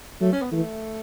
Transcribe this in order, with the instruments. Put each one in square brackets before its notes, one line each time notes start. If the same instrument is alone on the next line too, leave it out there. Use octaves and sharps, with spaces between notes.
[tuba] F#3 [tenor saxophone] A3
[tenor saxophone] C#4
B3
[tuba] E3 [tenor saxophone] A3